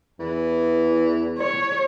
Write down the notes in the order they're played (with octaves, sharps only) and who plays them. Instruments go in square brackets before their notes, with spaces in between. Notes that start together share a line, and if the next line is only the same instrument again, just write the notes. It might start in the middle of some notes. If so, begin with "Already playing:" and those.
[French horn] E2 [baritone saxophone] E3
[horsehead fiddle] C#5